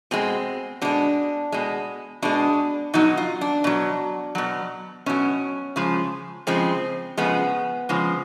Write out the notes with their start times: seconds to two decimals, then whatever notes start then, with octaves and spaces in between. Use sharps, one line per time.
0.11 B2 G#3 C4
0.82 B2 G#3 D4
1.52 B2 G#3
2.22 B2 G#3 D4
2.94 B2 F#3 D#4
3.17 F4
3.41 D4
3.64 B2 F#3
4.35 B2 F#3
5.06 B2 F#3 C#4
5.76 C#3 F3 G#3
6.47 C#3 F3 G#3 C4
7.17 C#3 F3 G#3 B3
7.89 C#3 F3 G#3